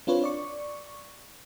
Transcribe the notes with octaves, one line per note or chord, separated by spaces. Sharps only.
C4 D4 F4 B4 C#5
D5 C#6